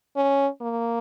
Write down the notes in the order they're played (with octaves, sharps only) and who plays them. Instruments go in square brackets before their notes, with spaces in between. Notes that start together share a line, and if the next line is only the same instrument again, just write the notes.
[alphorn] C#4
A#3